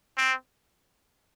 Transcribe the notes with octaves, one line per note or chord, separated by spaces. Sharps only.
C4